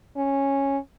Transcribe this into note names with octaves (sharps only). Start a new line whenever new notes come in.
C#4